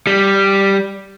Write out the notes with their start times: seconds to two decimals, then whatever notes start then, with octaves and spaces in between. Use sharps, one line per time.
0.07 G3